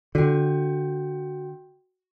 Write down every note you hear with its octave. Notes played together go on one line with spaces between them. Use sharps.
D3 F#4 G5